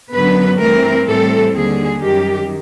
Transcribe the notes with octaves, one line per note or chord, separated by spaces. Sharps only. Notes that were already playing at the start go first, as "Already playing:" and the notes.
F#2 D3 F#3 B3 B4
G2 E3 A3 C4 A#4
A2 E3 G3 C4 A4
D#2 D3 G3 G#4
F#2 D#3 G3 G4